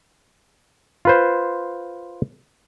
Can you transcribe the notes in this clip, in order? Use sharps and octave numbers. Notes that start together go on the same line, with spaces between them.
F4 B4 C5